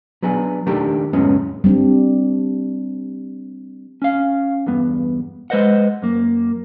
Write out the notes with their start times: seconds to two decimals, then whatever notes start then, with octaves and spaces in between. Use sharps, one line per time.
0.23 F#3 B3 D4 G#4
0.66 D#3 A3 D4 G4 A#4
1.13 C#2 F#2 A2 G#3 B3 C#4
1.64 G3 C4 D4
4.02 C#4 F5
4.66 E2 G2 B3
5.50 G#3 B4 C5 D#5 F#5
6.02 F#2 A#3